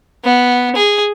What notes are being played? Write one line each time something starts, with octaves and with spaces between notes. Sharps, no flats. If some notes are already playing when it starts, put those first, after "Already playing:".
B3
G#4